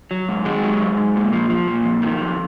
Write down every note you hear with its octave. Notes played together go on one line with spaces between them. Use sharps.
F#3
G#2
D#3 G#3
F#3
G#2
G#2
A#2
F3
F3
A#2
F2
D#3
F2